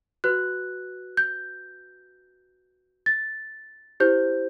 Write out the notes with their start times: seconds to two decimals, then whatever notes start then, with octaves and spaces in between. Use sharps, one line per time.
0.24 F#4 B4 F#6
1.17 G6
3.06 A6
4.00 E4 G4 C5 G6